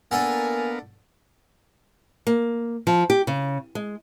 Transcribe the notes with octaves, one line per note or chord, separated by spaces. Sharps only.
A#3 B3 D4 A4 A#4 F5 F#5 G#5
A#3
F3
G4
C#3
G#3